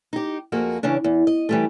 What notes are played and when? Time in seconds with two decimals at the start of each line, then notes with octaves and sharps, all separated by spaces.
0.13 D#4 G4
0.52 F2 A#3 F#4 G#4
0.83 C#3 E3 C#4 D4
1.04 E2
1.27 D#5
1.49 E3 G3 A3